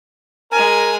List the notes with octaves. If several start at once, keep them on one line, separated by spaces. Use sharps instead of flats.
G#3 A#4 G#5